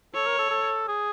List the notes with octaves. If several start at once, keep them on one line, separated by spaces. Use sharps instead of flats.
A4 C#5
A#4
A4
A4
G#4